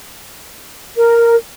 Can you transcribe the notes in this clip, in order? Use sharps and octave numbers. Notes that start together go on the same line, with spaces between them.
A#4